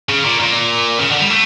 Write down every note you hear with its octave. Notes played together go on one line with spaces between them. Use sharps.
C#3
A#2
A#2
C#3
D3
G3
A3